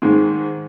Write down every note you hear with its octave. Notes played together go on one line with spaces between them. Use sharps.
G#2 D#3 G#3